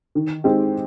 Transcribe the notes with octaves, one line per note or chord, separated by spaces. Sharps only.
D#3
G#3 C4 D#4 G4